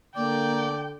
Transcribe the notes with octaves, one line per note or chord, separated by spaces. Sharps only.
D3 A#3 D5 G5